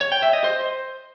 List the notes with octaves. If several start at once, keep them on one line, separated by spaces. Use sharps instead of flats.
C#5
G5
E5
D#5
C5